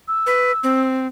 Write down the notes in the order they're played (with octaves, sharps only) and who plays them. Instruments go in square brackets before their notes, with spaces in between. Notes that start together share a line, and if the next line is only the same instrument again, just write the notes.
[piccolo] E6
[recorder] B4
C4